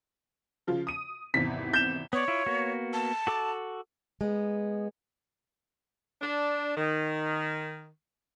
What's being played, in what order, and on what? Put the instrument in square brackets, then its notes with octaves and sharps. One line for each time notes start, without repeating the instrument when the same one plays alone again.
[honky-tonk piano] C#3 F3 F4
D#6 D#7
[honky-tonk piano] G#1 E2 C3 [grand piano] B6
[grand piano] G6 E7
[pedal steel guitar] B3 D5 [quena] C#5
[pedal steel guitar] E4 F4
A#3 B3 F#4
[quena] A5
[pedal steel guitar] F#4 A4 D6
[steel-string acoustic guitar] G#3 B3
[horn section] D4
D#3